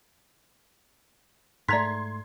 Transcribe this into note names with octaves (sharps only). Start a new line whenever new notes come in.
G#2 A3 D5 A#5 C6 G#6 B6